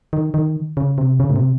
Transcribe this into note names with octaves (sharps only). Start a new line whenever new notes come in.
D#3
D#3
C#3
C3
C#3
A2
C3